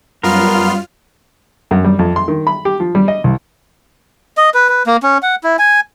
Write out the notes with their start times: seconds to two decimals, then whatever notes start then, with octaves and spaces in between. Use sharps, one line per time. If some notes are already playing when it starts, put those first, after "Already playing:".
0.23 F#2 G3 B3 F4 A#4 C6 F6
1.71 F#2
1.84 G3
1.99 F2
2.16 C6
2.28 D#3
2.47 B5
2.65 G4
2.80 F3
2.95 G3
3.08 D#5
3.24 C2
4.37 D#5
4.54 B4
4.69 B4
4.87 A#3
5.03 C#4
5.23 F#5
5.44 E4
5.59 G#5